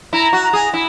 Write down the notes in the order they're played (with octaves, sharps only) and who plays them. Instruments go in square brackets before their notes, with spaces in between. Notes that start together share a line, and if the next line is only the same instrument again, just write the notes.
[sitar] E4 [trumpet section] A#5
[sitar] F#4
[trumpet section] A#5
[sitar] G#4
E4